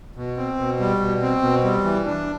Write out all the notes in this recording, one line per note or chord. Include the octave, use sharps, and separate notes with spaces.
B2
C4
B2
G3
B2
C4
B2
G3
E3
D4